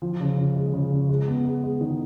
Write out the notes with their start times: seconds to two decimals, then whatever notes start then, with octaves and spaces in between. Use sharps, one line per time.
0.02 F3
0.20 C#3
0.38 C#3
0.56 G#3
0.73 C#3
0.92 C#3
1.09 G#3
1.28 B3
1.45 G#3
1.63 G#3
1.81 D#3